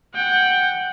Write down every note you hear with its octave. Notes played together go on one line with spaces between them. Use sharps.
F#5 G5